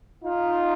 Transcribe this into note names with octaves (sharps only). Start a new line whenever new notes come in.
D#4 F4